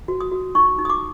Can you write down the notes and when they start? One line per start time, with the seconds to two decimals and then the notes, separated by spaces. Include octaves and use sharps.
0.08 F#4
0.21 D#6
0.32 F#4
0.55 D#4 C#6
0.79 D#4
0.85 D#6
0.90 D6